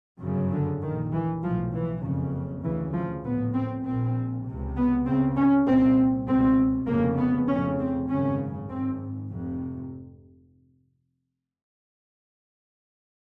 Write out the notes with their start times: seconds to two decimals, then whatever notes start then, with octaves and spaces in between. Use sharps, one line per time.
0.21 G1 F#2 C#3
0.51 D3
0.81 A#1 A#2 D#3
1.12 E3
1.43 B1 A2 F3
1.72 E3
2.04 F#1 F2 C#3
2.63 D2 C#3 E3
2.94 F3
3.24 A#1 A2 B3
3.54 C4
3.85 A#1 A#2 C4
4.45 C#2 C3
4.76 B3
5.06 C#2 C#3 C4
5.36 C#4
5.66 C2 A#2 C4
6.27 C#2 B2 C4
6.87 F1 F2 C#3 A#3
7.18 B3
7.48 F1 F2 C#3 C#4
7.78 C4
8.09 G#1 F#2 C#3 C#4
8.69 G#1 G#2 C4
9.30 F1 F2 C3